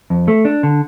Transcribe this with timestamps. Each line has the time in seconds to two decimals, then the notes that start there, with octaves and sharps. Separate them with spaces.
0.10 F2
0.28 A3
0.45 D4
0.63 D3